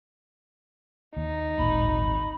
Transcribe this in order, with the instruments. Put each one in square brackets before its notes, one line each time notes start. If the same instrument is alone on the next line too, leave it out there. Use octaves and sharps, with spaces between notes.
[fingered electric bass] D#2 [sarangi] D#4
[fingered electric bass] D1 A#2 [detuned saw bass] G#1 [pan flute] B5